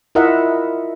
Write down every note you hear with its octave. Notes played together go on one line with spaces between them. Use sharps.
E4 F4 A#4 D#5 E5 F#5